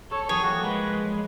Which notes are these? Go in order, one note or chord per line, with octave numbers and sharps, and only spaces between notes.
A4 C#5
E3 F#3 G3 G#4 C#5
F3 A#3 F#4
G#3 A#4 B4